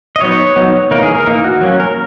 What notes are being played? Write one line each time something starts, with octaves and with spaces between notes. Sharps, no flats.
D#5
F#3 B3 D#4 C#5
F#3 B3 D#4
E3 A#3 D#4 A#4
G#4
A#4
E3 A#3 D#4
F#4
F#3 A#3 C#4
A#4